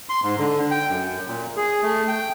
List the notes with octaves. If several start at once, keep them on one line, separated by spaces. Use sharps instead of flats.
C6
G#2
D3
G5
F#2
A#2
G#4
A3
G5